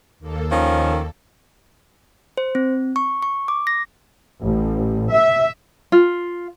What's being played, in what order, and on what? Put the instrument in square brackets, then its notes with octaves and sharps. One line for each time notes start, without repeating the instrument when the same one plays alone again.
[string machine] D#2 A#3 A4
[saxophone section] D#3 F3 C#4
[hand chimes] C5
C4
C#6
C#6
D6
A#6
[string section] A1
E5
[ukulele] F4